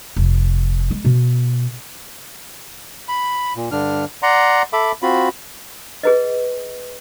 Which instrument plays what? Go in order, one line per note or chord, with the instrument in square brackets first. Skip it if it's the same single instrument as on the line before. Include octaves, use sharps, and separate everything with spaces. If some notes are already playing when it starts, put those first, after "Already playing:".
[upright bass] F1
G#3
B2
[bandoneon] B5
A#2
G2 D3 D4 F6
D5 F#5 A#5 C6
A4 E5 B5 D6
C4 F4 F#4 B5
[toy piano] G#4 B4 D#5